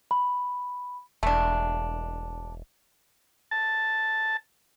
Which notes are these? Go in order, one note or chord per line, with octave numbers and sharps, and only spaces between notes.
B5
E1 A3 D4
A5